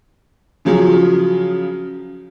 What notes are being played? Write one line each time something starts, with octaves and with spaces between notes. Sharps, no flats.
C#3 F3 F#3 G#4